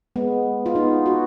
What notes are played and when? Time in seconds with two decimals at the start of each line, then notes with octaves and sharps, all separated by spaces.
0.16 G#3 B3
0.66 F4
0.75 B3 D#4
1.06 F#4